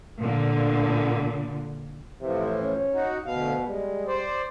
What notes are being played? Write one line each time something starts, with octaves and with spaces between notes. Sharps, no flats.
A#2 D3
A2 C3 E3 F3
C#4
D#4 F#4
D2 B2 F5
G3 G#3
C5 D5